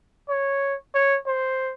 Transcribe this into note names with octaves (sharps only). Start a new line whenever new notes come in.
C#5
C#5
C5